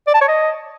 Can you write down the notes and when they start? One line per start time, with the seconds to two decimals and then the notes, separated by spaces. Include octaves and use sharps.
0.07 D5
0.14 A5
0.21 C#5
0.28 D#5